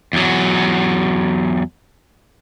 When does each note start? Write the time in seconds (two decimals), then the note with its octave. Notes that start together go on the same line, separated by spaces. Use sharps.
0.13 E2 F#3